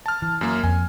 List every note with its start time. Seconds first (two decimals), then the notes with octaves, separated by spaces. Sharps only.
0.06 A5 F6
0.22 E3
0.41 F#2 A#3
0.64 F2 G#5